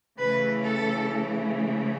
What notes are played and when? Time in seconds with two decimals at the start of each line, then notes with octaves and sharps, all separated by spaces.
0.19 C#3 E3 A3 B4
0.63 A4